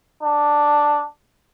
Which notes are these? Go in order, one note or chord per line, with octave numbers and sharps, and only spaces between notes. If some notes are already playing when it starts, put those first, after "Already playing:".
D4